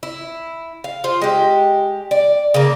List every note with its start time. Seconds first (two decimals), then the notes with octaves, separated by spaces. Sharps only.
0.03 E4
0.84 F5
1.04 F4 C5
1.21 G#3 G4
2.11 D5
2.54 C#3 A#3